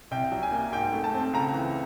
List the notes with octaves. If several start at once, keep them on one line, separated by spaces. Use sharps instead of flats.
C2 G5
F#3
G#5
A#3
G#2 G5
A3
A5
C4
C#2 A#5
E3